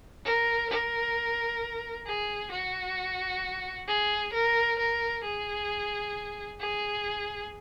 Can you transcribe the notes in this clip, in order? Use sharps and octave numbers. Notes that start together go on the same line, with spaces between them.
A#4
A#4
G#4
F#4
G#4
A#4
A#4
G#4
G#4